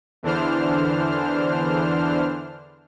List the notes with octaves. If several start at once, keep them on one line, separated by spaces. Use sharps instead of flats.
E2 D3 E3 D4 C5 F6